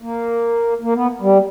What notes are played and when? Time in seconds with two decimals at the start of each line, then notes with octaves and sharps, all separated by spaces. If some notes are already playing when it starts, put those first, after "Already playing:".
0.02 A#3
0.82 A#3
0.95 B3
1.21 G3